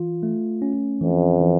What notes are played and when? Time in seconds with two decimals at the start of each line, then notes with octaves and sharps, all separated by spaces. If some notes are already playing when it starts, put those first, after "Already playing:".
Already playing: E3 F4
0.23 A3
0.62 C#4
1.01 F2 E3
1.40 E3